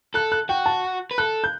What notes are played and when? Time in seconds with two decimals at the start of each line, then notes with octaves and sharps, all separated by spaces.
0.14 A4 F#6
0.32 F#6
0.49 F#4 G5
0.66 A5
1.11 B4
1.18 A4 F#6
1.44 G6